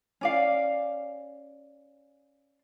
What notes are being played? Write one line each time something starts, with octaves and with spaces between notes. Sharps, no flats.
C#4 D5 F5